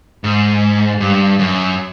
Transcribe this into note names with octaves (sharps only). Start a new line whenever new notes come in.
G#2
G2
F#2